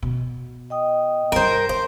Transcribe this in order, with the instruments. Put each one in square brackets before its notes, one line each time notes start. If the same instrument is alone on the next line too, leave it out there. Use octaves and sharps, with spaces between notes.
[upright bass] B2
[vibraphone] D#5 G5 D#6
[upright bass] G2 G3 [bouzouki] A#4 C5
[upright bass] B3 [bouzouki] C5